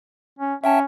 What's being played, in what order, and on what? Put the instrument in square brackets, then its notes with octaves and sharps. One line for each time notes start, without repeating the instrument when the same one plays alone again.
[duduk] C#4
[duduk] C#4 [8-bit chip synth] E5 G5 A5